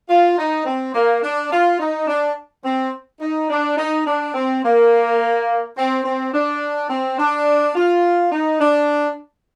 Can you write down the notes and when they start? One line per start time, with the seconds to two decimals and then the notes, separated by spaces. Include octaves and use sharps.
0.10 F4
0.38 D#4
0.65 C4
0.94 A#3
1.23 D4
1.51 F4
1.79 D#4
2.07 D4
2.64 C4
3.21 D#4
3.49 D4
3.77 D#4
4.06 D4
4.34 C4
4.63 A#3
5.77 C4
6.05 C4
6.33 D4
6.90 C4
7.18 D4
7.75 F4
8.32 D#4
8.60 D4